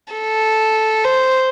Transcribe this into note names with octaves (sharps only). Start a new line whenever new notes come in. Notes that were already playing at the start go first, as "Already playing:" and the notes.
A4
C5